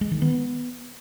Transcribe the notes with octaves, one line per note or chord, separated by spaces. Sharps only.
G#3
D#3
B3